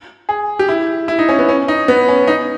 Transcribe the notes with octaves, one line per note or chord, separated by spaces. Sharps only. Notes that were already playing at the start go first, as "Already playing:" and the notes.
G#4
G4
E4
E4
D#4
C#4
B3
C#4
D#4
B3
C#4
D#4